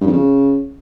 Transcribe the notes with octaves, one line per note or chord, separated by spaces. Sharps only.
G2
F2
C#3